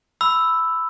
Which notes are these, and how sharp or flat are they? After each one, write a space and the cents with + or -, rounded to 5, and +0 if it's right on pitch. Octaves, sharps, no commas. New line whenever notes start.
B5 +15 E6 +0